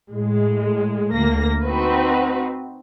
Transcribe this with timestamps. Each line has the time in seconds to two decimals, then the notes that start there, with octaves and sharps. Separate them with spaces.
0.10 A2 G#3
1.14 D2 A#3 A#6
1.64 C4 D#4 F#4 B4